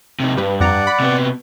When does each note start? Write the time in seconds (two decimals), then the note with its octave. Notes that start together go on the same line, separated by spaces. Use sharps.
0.20 C3 D#4
0.37 G2 G3 B4
0.60 F2 D5 F#5 A#5
0.87 B5
1.00 C3 B3